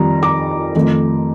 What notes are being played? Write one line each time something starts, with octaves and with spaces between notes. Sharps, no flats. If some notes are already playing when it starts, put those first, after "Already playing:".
Already playing: F2 D#3 G3 A#5
A#5 D6
F2 D#3 A3